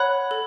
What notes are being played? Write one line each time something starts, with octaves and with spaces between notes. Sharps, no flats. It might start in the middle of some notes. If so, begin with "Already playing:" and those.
Already playing: C#5 F#5 B5 F#6
A4